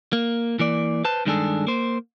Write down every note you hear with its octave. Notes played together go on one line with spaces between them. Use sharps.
A#3
E3 A#3 D5
B4 C5 A5
G2 D#3 G#3 D4 G#4 A4
A#3 C5